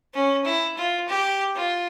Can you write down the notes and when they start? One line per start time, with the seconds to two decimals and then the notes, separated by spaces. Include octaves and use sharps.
0.14 C#4
0.45 E4
0.77 F4
1.09 G4
1.56 F4